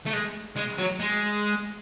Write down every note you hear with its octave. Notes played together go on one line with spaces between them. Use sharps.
A3
G#3
G#3
F#3
G#3